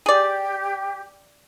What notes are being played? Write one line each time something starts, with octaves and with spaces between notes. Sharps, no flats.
G4 G#4 D5